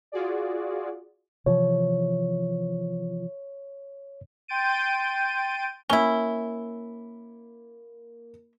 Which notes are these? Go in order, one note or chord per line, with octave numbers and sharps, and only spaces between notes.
F4 F#4 G#4 D5
C3 E3 F3 C#5
G5 C6 G6 A6 D7 D#7
A#3 C#4 E4 G7